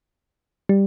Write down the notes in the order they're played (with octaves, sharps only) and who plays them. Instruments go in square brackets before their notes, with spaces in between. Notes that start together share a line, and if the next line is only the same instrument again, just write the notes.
[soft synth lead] G3